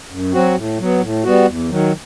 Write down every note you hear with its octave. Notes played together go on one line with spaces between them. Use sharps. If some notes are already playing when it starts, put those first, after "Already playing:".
F#2
F#3 C4 F#4
A2
F#3 B3
A2
G3 B3 F#4
E2
D#3 F#3